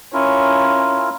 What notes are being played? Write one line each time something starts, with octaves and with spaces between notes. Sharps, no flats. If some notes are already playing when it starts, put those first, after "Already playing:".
C#4 E4 F4 A#4